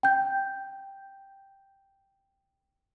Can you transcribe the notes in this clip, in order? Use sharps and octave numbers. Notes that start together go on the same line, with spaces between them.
G5 G6